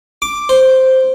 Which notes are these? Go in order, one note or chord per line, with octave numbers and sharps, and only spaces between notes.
D6
C5